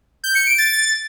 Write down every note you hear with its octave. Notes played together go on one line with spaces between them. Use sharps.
G6
C#7
D7
A6